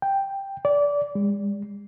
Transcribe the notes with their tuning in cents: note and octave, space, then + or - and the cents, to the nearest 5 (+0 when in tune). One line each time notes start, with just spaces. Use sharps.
G5 +5
D5 -20
G#3 -40